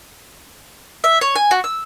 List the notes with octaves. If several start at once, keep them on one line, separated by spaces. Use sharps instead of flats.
E5
C#5
G#5
F#4
E6